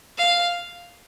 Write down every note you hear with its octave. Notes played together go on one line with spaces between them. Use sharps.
F5